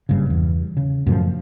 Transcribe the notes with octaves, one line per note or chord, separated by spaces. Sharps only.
F#1 G2 C#3
E2
C#3
F#2 A2 F3